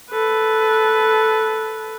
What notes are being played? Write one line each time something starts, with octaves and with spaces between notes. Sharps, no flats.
A4 B4